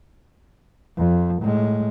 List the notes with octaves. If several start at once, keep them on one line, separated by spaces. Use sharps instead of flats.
F2
A2 G#3